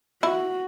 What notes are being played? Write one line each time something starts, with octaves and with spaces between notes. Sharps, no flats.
E4 F#4